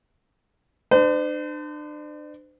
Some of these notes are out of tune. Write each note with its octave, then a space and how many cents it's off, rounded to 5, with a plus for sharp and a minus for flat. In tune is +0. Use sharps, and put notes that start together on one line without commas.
D4 +35 C5 -40